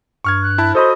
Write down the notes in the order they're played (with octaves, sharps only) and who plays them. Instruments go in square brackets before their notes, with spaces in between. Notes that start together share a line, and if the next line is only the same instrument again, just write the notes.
[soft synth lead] G2 [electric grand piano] C#6 F6 G#6
[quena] F#6
[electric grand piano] E4 A5 B5
[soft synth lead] F#4 [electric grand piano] A4 D#5 B5 [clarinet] C5 [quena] D#6